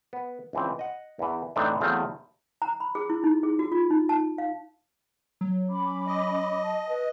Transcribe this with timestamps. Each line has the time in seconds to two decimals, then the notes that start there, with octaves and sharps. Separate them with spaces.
0.13 B3
0.53 C#2 E3 C4
0.79 D#5 F#5
1.19 E2 E3
1.56 A2 E3 G#3 C4 D4 D#4
1.81 E2 F#3 A3 C4 G#4 F5
2.62 A#5
2.80 B5
2.95 G#4
3.10 E4
3.24 D#4
3.43 G#4
3.59 F#4
3.72 F4
3.90 D#4
4.09 A5
4.38 F5
5.41 F#3
5.68 C#4 B5 D6
6.07 D#5
6.63 A5
6.89 B4